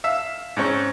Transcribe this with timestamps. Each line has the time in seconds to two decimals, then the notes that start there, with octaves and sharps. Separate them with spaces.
0.04 E5 F5 E6
0.57 G#2 C4 C#4 C#6